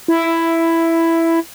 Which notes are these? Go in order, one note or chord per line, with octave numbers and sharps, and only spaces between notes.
E4